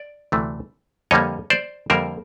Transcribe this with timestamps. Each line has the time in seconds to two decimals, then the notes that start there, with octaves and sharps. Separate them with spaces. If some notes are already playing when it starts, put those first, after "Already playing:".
Already playing: D5
0.32 D2 C3 E3 A3
1.11 F2 D3 G3 A#3 C#5 D#5
1.50 C5 D5
1.90 F2 D3 G3 A#3 A#4 C5